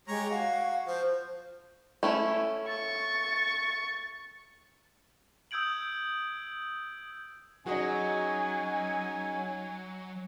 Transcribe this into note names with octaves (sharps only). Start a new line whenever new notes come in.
G#3 G4 C#5 A#5
F#4 F5
F3 C5
A3 C#4 E4
C#6 A6
D#6 E6 G6 G#6 D7 F#7
F#3 C#4 D#4 F#4 G#4 D#5 G#5